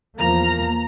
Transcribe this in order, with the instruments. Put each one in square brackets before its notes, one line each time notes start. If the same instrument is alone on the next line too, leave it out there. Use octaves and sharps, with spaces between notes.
[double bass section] E2 F3 A#3 [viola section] A#5